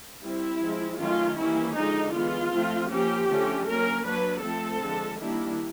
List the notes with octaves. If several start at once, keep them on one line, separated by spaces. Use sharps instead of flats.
G3 C4 E4
F3 G#3 C4
D#3 F#3 A3 C#4 F4
E3 G3 A#3 C#4 E4
D3 F3 G#3 D#4
E3 G#3 B3 F4
F3 A3 C4
F3 A#3 C#4 G4
D3 F3 A3 C#4
F#3 A#3 C#4 A#4
F#3 A#3 D4 B4
F3 A3 C4 A4
D3 F3 G#3
D#3 G3 A#3 D4 E4